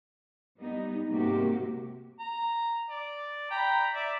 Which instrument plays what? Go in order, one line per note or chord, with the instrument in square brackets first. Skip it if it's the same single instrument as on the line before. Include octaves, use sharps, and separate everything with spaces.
[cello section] G3 B3 D#4
G#2 C3 A#3 F#4 G4
[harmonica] A#5
D5
G5 A#5 B5
D5 E5